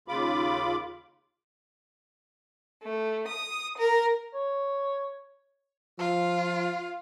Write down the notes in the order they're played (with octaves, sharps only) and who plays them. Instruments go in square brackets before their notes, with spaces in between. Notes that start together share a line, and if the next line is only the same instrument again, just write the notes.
[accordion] D#2 C#3 F4 B5 D6
[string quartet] A3
D#6
A#4
[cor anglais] C#5
[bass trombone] F3 [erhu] F4